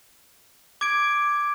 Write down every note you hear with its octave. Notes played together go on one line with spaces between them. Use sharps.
D6 G#6 D7